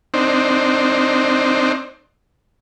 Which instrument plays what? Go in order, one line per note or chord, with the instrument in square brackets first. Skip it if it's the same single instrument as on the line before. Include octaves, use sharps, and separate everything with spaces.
[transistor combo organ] C4 D4 D#4 C5